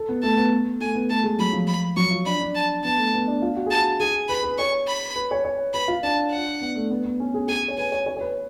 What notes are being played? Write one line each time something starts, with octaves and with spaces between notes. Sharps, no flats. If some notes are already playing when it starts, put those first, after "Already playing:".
Already playing: A4
B3
A3 A5
B3
A3 G#5
B3
A3 A5
G#3
F#3 B5
F3
B5
F#3 C#6
F4
D4 B5
D4
A5
B3 A5
A3
B3
D4
F4
F#4
G#4 A5
F#4
G#4 G#5
B4 B5
B4
C#5 C#6
B5
B4
C#5
C#5
B4 B5
F4
D4 A5
F#5
B3
A3
B3
B3
C#4
G#4
G#4 G#5
C#5
B4 G#5
C#5
C#5
C#5
B4